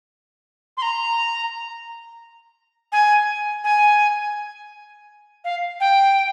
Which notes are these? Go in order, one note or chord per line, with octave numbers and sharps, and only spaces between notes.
C6
A#5
G#5
G#5
F5
G5